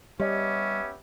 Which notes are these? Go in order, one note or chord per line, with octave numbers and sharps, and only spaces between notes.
G3 B3 C#4 G4 C#5 D#5 E5